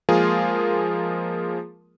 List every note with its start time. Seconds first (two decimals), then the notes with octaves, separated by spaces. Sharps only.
0.09 F3 G#3 A#3 F4 G#4 A#4